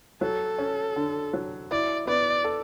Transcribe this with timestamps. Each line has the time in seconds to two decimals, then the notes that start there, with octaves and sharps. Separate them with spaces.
0.21 F#3 A4
0.58 C#4
0.96 D3
1.33 F#3
1.71 E4 D5
2.07 B3 D5
2.44 A4